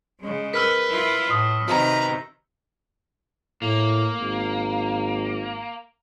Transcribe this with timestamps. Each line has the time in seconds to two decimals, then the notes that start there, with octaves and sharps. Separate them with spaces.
0.21 C#3 G#3
0.54 A#4 B4 E6 F6 B6
0.89 E4 F4
1.31 A2 D#6
1.68 C3 D#3 F#4 B4 A#5
3.62 A2 A#3
4.19 G#1